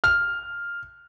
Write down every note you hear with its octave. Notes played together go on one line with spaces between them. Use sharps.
F6